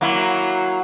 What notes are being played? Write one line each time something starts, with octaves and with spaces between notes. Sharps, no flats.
F#3 A#3 E4